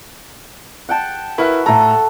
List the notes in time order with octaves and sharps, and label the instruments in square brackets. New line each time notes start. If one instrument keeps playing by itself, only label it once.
[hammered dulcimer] F#5 G5 A5
[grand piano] E4 A#4 B4 [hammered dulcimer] F#4 F5
[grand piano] A2 A#5 [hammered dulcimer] A4